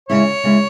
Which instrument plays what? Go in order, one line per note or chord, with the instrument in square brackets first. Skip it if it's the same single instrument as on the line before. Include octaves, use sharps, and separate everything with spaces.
[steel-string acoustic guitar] C#3 G#3 C#4 E4 [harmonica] C#5
[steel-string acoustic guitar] C#3 G#3 C#4 E4